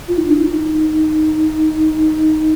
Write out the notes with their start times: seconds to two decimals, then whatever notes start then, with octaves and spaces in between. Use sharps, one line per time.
0.08 F4
0.18 D#4
0.27 D4
0.37 F4
0.41 D#4